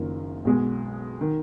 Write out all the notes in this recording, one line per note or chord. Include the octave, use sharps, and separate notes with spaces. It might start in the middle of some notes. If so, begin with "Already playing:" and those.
Already playing: F#1 F#2 D#3 A#3 F4
B1 B2 G#3
D#3